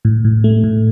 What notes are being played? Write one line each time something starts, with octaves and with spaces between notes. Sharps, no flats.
A2
A2
A3
A2